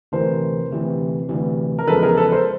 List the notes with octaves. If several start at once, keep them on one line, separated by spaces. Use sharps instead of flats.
D2 C3 E3 A#4 C5
D2 C3 E3
D2 C3 E3
A#4
E2 C#3 F3 G#3 A4 B4
G#4 A#4
A4 B4
A#4 C5